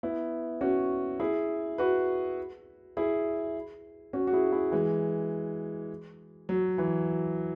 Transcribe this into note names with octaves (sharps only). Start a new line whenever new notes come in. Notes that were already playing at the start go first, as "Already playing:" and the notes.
B3 E4
C#4 F#4
E4 G#4
F#4 B4
E4 G#4
C#4 F#4
F#4
E4 G#4
E4 G#4
E3 G#3
F#3
E3